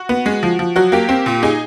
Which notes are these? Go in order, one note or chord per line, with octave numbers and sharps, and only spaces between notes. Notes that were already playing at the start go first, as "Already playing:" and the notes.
Already playing: F#4
B3
G#3
F3
F3
F#3 F#4
A#3 G4
C4
A#2
D#4 G#4